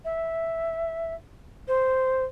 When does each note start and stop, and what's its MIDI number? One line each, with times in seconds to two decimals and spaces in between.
0.04 1.14 76
1.67 2.23 72